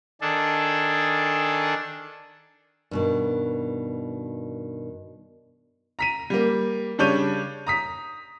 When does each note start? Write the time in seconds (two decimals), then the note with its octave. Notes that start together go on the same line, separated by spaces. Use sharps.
0.21 D#3 D4 G#4 A4
2.91 G2 B2 D#3
5.99 A#5 B6 D#7
6.30 G3 A#3
6.98 C#3 G3 D4 C#5 G6 D#7
7.67 A#5 D#6 B6